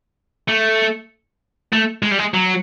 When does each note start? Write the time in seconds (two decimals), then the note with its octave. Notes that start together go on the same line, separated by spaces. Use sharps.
0.48 A3
1.73 A3
2.03 G#3
2.11 G3
2.19 G#3
2.34 F#3